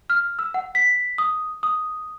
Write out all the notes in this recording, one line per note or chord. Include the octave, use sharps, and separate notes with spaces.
F6
E6
F#5
B6
D#6
D#6